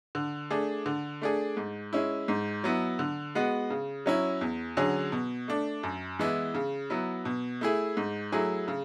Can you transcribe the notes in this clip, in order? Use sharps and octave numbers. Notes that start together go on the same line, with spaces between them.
D3
A3 D4 G#4
D3
A3 D4 G#4
G#2
G#3 C#4 E4
G#2
F#3 B3 E4
D3
G#3 B3 F#4
C#3
F#3 C#4 E4
E2
D3 F#3 C#4 G#4
B2
A3 D4
F#2
E3 G#3 B3 E4
C#3
F#3 B3 E4
B2
A3 E4 G#4
G#2
F#3 A3 E4 G#4
C#3